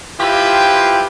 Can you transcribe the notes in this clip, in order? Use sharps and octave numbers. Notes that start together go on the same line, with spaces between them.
F3 E4 F4 G4 B4 G5